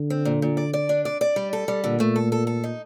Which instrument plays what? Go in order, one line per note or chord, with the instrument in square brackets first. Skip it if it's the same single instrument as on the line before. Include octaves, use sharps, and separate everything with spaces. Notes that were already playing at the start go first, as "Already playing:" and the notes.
Already playing: [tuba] D3
[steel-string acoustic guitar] C4
A#2
A#2
D5
D5
D4
D5
D5
G3
A4
G3
[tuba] A#2 [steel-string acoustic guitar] D3
[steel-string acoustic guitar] A3
A4
A4
A4
D#4